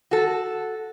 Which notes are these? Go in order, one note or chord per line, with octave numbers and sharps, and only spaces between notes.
F#4 A4